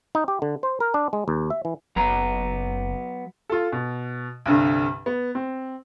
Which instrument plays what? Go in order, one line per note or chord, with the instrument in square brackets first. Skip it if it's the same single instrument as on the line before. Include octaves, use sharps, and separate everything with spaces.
[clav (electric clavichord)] D#4
G4
D3
C5
A#4
D4
G#3
D#2
E5
E3
[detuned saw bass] F#1 [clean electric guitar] F#3 B3 A#5
[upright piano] F4 A4
B2
C2 G2 D3
B3
C4